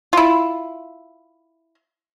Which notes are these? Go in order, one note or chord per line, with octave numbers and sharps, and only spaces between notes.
E4 F4